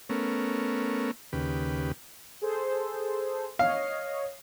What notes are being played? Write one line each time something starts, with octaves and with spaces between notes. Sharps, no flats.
A3 B3 C#4 A#4
D#2 C#3 G4 B4
G#4 A4 C5
C#5 D#5 F5